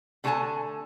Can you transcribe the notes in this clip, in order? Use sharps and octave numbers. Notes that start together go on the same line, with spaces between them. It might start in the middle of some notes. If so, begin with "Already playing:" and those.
D3 A3 A4 A#4 G#5 A5